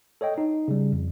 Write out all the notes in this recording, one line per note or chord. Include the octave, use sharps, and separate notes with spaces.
A4 C#5 D#5 G5
D#4
C#3 G3
F2